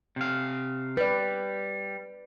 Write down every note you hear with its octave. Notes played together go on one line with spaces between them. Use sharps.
C3 F5
G3 B4 D5